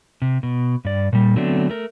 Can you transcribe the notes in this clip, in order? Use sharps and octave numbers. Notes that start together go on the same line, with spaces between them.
C3
B2
G2 D5
A#2 G3
D3 F#3 A3 B3 C4 D4
A3 A#4